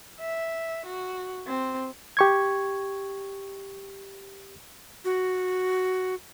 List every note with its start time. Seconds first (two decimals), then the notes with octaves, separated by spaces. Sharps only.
0.20 E5
0.86 F#4
1.47 C4
2.17 G4 C#6 G#6
5.05 F#4